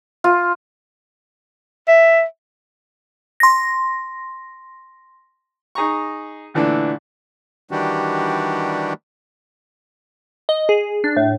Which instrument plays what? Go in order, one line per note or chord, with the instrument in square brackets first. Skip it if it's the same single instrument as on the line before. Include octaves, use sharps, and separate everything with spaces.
[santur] F4
[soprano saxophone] E5
[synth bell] C6 A#6
[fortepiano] D#4 G#4 A#5 C#6
A#2 D3 E3 A3 D4
[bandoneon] D#3 E3 G3 D4 F#4 G4
[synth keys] D#5
G#4
D4
A2